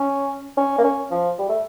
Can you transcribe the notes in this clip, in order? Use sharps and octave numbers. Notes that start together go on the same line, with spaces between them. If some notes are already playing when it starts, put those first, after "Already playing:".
Already playing: C#4
C#4
A#3
C#4
F3
G3
A3